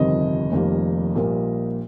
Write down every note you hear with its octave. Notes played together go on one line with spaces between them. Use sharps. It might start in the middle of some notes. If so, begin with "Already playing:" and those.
Already playing: G1 F2 C3 D#3 D#5
F1 F2 D#3 G3 A#3
A#1 A#2 G3 A#3